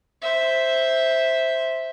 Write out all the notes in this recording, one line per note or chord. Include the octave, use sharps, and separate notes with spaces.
C5 E5